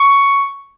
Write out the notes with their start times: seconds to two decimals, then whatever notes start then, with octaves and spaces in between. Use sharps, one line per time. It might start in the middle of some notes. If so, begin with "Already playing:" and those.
Already playing: C#6